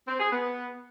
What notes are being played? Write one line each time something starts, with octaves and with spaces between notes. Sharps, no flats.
C4
G#4
B3